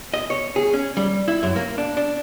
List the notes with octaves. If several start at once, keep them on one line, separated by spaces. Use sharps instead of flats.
D#5
C#5
G#4
C#4
G3
E4
F#2
A#3
D4
D4